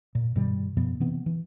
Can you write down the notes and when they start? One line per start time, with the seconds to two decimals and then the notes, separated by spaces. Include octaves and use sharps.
0.15 A#2
0.36 G2 B2 D#3 G3
0.77 F#2 B2 F3 B3
1.00 C3 E3 B3 C4
1.26 E3